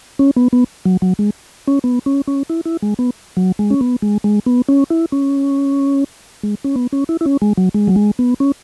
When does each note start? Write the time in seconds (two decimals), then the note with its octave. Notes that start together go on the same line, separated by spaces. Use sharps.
0.19 C#4
0.36 B3
0.53 B3
0.85 F#3
1.02 F#3
1.19 G#3
1.67 C#4
1.84 B3
2.06 C#4
2.27 C#4
2.49 E4
2.65 E4
2.82 G#3
2.99 B3
3.37 F#3
3.59 G#3
3.70 C#4
3.81 B3
4.02 G#3
4.24 G#3
4.46 B3
4.69 C#4
4.90 E4
5.12 C#4
6.43 G#3
6.64 C#4
6.76 B3
6.93 C#4
7.09 E4
7.21 E4
7.26 C#4
7.42 G#3
7.57 F#3
7.74 G#3
7.87 F#3
7.96 G#3
8.19 B3
8.40 C#4